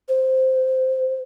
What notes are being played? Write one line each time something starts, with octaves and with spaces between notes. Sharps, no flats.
C5